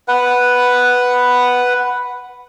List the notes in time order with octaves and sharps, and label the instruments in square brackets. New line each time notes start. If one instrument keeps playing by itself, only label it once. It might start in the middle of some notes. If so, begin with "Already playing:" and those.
[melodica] B4 F#5